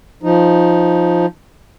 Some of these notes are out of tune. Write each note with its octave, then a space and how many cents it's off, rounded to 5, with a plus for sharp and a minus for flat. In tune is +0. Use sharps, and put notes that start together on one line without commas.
F3 +0 D#4 +0